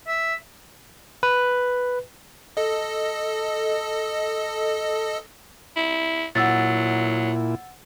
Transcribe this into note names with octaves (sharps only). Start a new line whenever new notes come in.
E5
B4
A4 D#5
E4
A#2 F#3 E4 F#5 E6 A6